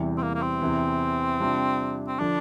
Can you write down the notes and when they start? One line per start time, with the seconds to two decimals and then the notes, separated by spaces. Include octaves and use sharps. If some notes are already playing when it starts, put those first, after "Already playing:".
Already playing: E2 C3 E3 G3
0.18 C4
0.22 A#3
0.35 A#3
0.42 C4
0.62 E2 C3 E3
1.40 C3 G3 D4 F4
2.08 C4
2.20 D3 F3 D4